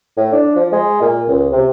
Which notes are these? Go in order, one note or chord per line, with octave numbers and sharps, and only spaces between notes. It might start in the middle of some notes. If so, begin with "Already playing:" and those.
A2
D4
F3
G#3
A#2
C#2
C3